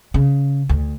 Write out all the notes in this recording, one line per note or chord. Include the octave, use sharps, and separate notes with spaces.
C#3
D2